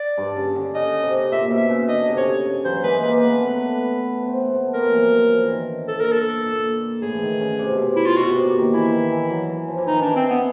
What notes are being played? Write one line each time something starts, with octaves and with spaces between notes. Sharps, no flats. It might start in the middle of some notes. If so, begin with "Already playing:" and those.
Already playing: D5
G2
C#3
D3
C#3 D#5
C3
A#2 E5
B2
E5
C#3
D3 D#5
C3
C#3 C#5
C#3
E3 F#3 C5
G#3 A#3 B4
G#3 A#3 B4
A3 B3
A3 B3
B3
C4
B3
C4
A3 B3
A#3 C4 A#4
F3
E3 F#3
F3
E3
D#3
D3
A#2 A4
A#4
A4
A#2
A2 G#4
E3
D#3
C#3
C3
B2
C3
E4
F4
B2 F#4
C3
A#2
D#3
E3 E4
D#3
E3
E3 F#3
E3
F3
E3
D#3 D#4
E3 D4
C4
B3